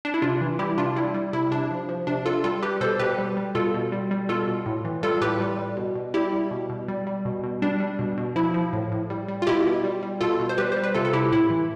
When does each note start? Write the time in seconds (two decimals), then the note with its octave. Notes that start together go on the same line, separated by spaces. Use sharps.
0.05 D4
0.14 E4
0.22 C3 D4 F4
0.41 E3
0.59 G3 E4 G4
0.78 C3 D4 F4
0.96 G3 E4
1.14 G3
1.33 C3 E4
1.51 C3 D4
1.71 F3
1.89 F3
2.07 C3 D4
2.26 C3 F4 A4
2.44 G3 F4 A4
2.63 G3 G4 B4
2.81 B2 A4 C5
2.99 B2 G4 B4
3.18 G3
3.37 G3
3.55 B2 F4 A4
3.74 B2
3.92 G3
4.11 G3
4.29 B2 F4 A4
4.48 B2
4.66 A2
4.85 E3
5.03 G3 F4 A4
5.21 A2 G4 B4
5.40 G3
5.59 G3
5.77 B2
5.96 B2
6.14 G3 E4 G4
6.33 G3
6.51 B2
6.69 B2
6.88 G3
7.07 G3
7.25 B2
7.43 B2
7.62 G3 D4
7.80 G3
7.99 B2
8.17 B2
8.36 F3 E4
8.54 F3
8.73 A2
8.92 A2
9.10 G3
9.28 G3
9.42 F4
9.47 B2 E4 G4
9.65 B2
9.84 G3
10.03 G3
10.21 B2 F4 A4
10.40 B2
10.49 C5
10.58 G3 G4 B4
10.72 G3 C5
10.84 B4
10.94 C3 F4 A4
11.05 A4
11.13 C3 E4 G4
11.32 A2 E4
11.50 E3